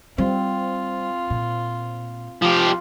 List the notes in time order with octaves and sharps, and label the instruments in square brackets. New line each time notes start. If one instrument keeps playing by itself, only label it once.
[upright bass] G3 [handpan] C4 [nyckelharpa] F4
[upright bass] A#2
[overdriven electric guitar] F3 G4 [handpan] F4